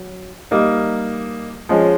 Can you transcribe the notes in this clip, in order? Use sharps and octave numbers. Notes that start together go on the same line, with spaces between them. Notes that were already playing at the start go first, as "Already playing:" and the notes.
Already playing: F#3
G3 A#3 D#4
F3 G#3 C#4